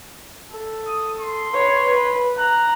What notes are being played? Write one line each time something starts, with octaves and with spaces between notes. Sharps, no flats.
A4
D#6
C6
B4 C#5
B4
A#5 F#6